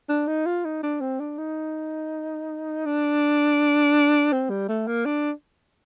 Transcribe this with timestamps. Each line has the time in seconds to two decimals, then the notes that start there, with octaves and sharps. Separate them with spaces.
0.09 D4
0.28 D#4
0.46 F4
0.65 D#4
0.83 D4
1.01 C4
1.20 D4
1.38 D#4
2.86 D4
4.32 C4
4.50 G3
4.69 A3
4.87 A#3
5.06 D4